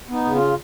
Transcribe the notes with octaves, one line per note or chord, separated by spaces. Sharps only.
B3 D#4
C#3
F4